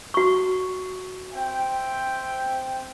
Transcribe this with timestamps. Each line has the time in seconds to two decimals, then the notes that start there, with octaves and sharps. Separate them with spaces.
0.14 F#4 C#6
1.33 C4 E5 G5